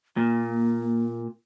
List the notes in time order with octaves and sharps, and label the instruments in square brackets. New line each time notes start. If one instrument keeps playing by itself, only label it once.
[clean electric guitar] A#2 [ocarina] A#3